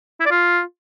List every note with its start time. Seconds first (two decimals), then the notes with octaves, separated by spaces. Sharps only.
0.20 E4
0.26 D5
0.31 F4